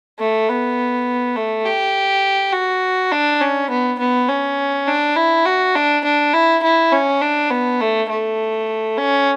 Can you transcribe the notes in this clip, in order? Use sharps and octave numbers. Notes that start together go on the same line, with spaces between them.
A3
B3
A3
G4
F#4
D4
C#4
B3
B3
C#4
D4
E4
F#4
D4
D4
E4
E4
C#4
D4
B3
A3
A3
C#4